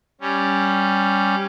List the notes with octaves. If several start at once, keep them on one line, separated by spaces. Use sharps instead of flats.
G3 C#4